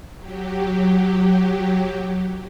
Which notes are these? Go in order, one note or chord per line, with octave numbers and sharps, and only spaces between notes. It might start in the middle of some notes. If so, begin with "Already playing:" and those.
F#3 G4